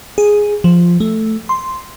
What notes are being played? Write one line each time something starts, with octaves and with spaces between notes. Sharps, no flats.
G#4
F3
A3
C6